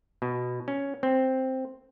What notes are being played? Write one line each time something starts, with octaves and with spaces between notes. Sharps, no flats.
B2
C#4
C4